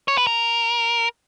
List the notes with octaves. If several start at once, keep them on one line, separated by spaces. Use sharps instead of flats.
C#5
B4
A#4